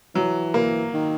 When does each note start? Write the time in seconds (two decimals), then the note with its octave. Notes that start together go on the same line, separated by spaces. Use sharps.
0.15 E3 F#3
0.54 A#3
0.94 D#3